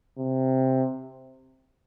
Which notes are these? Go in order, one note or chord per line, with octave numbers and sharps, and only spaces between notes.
C3